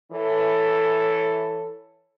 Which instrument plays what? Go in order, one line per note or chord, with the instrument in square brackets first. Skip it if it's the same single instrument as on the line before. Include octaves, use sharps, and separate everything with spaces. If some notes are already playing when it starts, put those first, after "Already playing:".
[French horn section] E3 A4 C#5